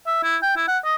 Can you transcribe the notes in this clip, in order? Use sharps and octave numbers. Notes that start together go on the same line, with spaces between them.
E5
E4
G5
E4
F#5
D#5